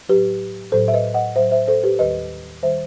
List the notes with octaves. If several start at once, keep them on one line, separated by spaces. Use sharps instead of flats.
A2 F#3 G4 B4
A2 F#3 A4 C5
E5
B4 D#5
D#5 F#5
A2 F#3 C5 E5
C5 E5
A4 C5
G4 B4
D#2 D#3 G3 B4 D#5
D#3 G3 C5 E5